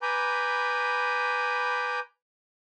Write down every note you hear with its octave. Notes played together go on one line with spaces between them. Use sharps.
B4 G#5 A#5 B5 D6 G6